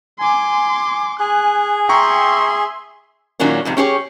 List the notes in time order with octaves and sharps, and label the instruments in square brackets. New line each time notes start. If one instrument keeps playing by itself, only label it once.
[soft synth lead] G#5 [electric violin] C6 D6
[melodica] G#4 [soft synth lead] G#5 [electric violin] F#6
[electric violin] E5 C6 [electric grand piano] G5 A#5 C#6
[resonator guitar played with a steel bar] A#2 D#3 F#3 C#4 D4
F2 G#2 C3
C#4 G4 G#4 C#5